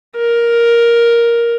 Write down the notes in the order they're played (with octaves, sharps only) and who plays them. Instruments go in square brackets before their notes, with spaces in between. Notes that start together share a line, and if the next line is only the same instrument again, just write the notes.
[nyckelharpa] A#4